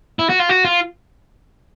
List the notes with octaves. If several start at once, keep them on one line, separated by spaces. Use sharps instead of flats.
E4
F#4
F4
F#4
F4